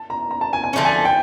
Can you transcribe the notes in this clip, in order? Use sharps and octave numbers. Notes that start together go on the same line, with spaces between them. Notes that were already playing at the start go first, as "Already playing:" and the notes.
Already playing: A5
A#5
A#5
A5
G#5
G#5
C#4
D3 F3 A3
G#5
G5